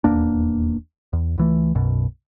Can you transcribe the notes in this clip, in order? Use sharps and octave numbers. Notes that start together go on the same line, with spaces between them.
D#1 E2 A#3 D4
E2
C#2 E3 A3
B1 F#2 B2